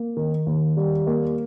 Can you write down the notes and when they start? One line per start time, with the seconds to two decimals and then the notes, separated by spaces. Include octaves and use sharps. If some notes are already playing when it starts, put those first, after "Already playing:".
Already playing: A#3
0.17 D#3
0.47 D#2
0.77 G3
1.07 A#3